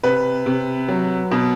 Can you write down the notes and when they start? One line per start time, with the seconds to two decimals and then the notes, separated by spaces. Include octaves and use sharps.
0.03 C3 B4
0.46 C3
0.88 F#3
1.31 B2